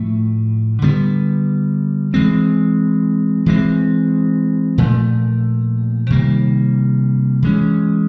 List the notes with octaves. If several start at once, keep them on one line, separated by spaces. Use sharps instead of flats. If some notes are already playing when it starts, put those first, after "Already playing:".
Already playing: A2 F3 A3
D3 G3 B3
E3 G#3 C4
E3 G#3 C4
A#2 F3 A3
C3 D#3 G3 A#3
E3 G#3 C#4